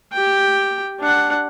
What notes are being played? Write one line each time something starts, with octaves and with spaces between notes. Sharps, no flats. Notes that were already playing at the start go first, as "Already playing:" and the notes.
G4 G5
D4 F#5